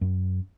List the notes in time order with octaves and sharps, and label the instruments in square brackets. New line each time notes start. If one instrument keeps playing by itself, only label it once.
[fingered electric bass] F#2